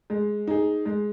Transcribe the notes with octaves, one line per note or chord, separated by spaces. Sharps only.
G#3
D#4 G#4
G#3